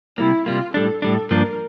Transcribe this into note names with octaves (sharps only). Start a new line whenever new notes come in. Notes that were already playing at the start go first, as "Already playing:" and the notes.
C3 G3 A#3 E4
C3 G3 A#3 F4
A2 G3 D4 A4
A2 G3 D4 A4
G2 F3 A#3 D4 A#4